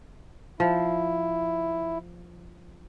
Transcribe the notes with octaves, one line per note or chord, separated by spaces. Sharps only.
F3 E4